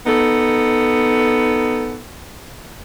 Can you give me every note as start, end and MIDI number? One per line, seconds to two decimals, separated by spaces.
0.05 2.01 59
0.05 2.01 63
0.05 2.01 69